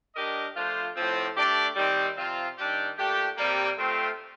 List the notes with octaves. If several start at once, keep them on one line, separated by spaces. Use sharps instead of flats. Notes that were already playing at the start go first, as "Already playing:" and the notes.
G3 D4 G4 A#4 D#5
F3 A3 D4 F4 C5
A2 F3 C4
A3 D4 G4 D5
D#3 G3 C4
C3 F3 C4 F4
D#3 G3 D4 G4
A#2 A3 D4 G4
C3 G3 A#3
A3 C4 F4